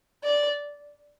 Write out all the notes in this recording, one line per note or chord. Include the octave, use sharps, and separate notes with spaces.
D5